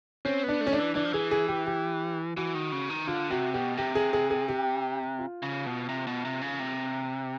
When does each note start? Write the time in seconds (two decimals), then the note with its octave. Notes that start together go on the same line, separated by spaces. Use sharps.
0.25 C4 C#4
0.44 B3 D4
0.61 A3
0.67 C#4
0.73 D4
0.79 E3
0.95 E3 D4
1.05 F3
1.13 E3 G#4
1.31 G#4
1.48 G4
1.67 G4
2.36 E3 F#4
2.55 D#3
2.72 C#3
2.90 D#3
3.07 D3 F4
3.31 C3 F#4
3.54 B2 G4
3.77 C3 G4
3.95 G#4
4.13 G#4
4.31 G#4
4.49 G4
5.19 F4
5.42 C#3
5.66 B2
5.89 C3
6.07 B2
6.25 C3
6.42 C#3
6.59 C3